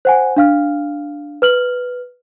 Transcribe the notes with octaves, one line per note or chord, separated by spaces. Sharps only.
C5 F#5 G#5
D4 F5 F6
B4 F6 F#7